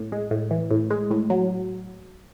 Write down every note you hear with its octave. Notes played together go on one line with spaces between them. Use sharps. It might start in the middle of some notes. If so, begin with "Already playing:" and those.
Already playing: A2
G#3
A2
E3
A2
G#3
A2
F#3